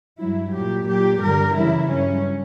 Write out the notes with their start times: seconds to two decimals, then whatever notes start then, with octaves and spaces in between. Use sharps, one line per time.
0.18 G2 F#3 E4
0.52 A#2 F#3 G4
0.86 A#2 F#3 G4
1.21 G2 D3 G3 A#4
1.55 F#2 C#3 E3 E4
1.90 G2 F#3 C#4